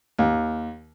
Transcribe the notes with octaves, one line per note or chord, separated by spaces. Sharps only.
D#2